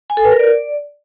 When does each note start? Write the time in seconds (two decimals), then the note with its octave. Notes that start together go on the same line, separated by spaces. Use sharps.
0.10 G#5
0.17 A4
0.25 B4
0.32 A#4
0.39 D5